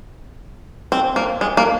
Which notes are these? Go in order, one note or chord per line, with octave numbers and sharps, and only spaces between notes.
C4
A#3
G#3
A#3